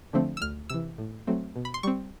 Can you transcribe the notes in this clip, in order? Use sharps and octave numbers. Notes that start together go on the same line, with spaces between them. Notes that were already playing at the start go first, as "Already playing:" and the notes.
D3 F3 A3 C4
E6
D2 F6
C3 E3 E6
A2
F#3 A3 C4
B2
B5
C6
G3 C4 C#6